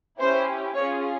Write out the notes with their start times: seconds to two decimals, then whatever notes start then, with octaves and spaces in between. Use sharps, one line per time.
0.20 C#4 E4 G4 C5
0.76 C#4 F4 G#4 C#5